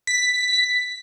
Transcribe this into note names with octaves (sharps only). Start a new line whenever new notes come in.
B6